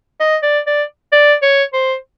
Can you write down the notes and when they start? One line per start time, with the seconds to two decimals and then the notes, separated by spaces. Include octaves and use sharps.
0.21 D#5
0.43 D5
0.67 D5
1.12 D5
1.42 C#5
1.73 C5